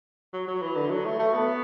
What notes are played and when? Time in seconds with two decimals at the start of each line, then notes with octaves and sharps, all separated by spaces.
0.33 F#3
0.48 F#3
0.62 E3
0.76 D3
0.91 F#3
1.05 A3
1.19 A3
1.34 B3